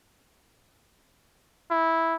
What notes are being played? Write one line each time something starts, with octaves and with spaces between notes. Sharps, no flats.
E4